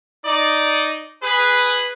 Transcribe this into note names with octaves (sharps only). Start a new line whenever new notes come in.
D#4 D5
G#4 B4